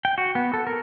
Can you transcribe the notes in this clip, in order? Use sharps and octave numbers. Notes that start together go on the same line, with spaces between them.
G5
F#4
B3
A4
A#4